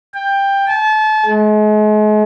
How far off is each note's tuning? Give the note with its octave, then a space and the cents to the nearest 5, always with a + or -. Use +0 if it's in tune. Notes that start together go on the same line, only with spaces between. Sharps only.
G5 +15
A5 -30
G#3 +40